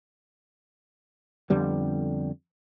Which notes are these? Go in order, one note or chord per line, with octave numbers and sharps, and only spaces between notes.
F2 D3 G3 B3